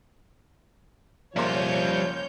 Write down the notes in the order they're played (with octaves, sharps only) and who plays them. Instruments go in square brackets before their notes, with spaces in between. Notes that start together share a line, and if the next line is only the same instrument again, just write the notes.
[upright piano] F#1 A#3 C6 [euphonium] F3 [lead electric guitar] G3 E5 [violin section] C#5 G6